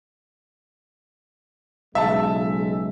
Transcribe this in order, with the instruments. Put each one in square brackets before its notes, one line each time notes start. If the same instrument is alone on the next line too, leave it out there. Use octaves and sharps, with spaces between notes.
[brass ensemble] B1 C#3 G#3 [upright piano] E5 A5